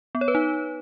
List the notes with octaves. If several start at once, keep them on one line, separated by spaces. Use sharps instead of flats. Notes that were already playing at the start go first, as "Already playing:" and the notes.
B3
C#5
B4
D#4